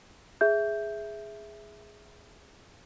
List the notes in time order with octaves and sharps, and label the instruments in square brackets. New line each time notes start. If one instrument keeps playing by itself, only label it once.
[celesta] G#4 E5 G6